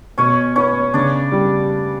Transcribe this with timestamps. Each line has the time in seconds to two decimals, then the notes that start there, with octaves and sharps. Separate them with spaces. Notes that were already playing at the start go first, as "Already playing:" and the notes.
0.18 B2 C#4 C#5
0.56 B3 C#4 C#5
0.94 C#3 D4 D5
1.32 G3